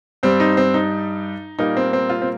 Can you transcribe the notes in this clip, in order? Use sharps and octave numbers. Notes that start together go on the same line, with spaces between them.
G2 G3 C4
D#4
C4
D#4
A#2 G3 A#3 D#4
C4
C4
F4
C4